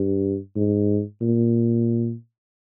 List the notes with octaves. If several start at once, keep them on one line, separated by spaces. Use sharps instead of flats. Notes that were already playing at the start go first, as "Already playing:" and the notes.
Already playing: G2
G#2
A#2